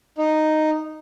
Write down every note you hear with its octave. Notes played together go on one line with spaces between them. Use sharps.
D#4